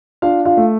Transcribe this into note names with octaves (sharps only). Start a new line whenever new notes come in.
D4 F4 F5
F4 F5
A3